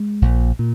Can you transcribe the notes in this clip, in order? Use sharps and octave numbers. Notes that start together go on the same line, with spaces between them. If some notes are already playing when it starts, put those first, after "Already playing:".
Already playing: G#3
A#1 A#2
A#2